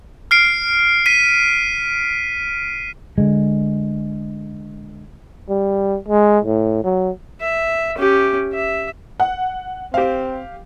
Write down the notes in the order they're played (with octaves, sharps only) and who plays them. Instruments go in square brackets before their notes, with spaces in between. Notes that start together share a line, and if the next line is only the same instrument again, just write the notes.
[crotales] F6 C7 D7
B6 D#7
[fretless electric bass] D3 G#3
[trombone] G3
G#3
A2
F#3
[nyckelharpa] E5
C#4 G4
E5
[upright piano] F#5
[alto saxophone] C4 [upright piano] G4 F5